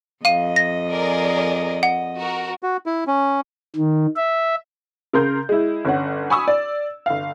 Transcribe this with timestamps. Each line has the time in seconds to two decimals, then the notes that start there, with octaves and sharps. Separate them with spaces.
0.25 F2 D#5 F5 D#7
0.56 A#6
0.90 G#4 A#4 D5
1.83 F#5
2.18 F#4 A#4
2.63 F#4
2.86 E4
3.07 C#4
3.76 D#3
4.17 E5
5.13 C#3 A#4 C6 G6
5.49 G#3 E4
5.85 G1 C#4 F#5
6.30 G#5 B5 C#6 D#6 E6
6.48 D5
7.06 G1 F5